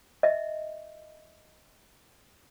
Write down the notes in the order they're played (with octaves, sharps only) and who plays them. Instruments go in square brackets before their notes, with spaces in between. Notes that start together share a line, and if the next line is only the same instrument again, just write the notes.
[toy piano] D#5 E5